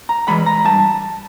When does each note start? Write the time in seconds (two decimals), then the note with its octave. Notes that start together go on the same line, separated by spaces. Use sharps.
0.09 A#5
0.28 E3 G#3 B5
0.46 A#5
0.65 G2 A5